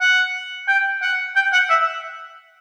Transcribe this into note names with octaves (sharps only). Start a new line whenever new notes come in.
F#5
G5
F#5
G5
F#5
E5